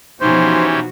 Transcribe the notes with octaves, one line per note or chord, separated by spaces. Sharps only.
B2 E3 F3 C#4 D#4 F#4 G4 C5